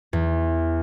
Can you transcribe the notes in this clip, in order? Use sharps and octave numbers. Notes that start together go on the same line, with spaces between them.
E2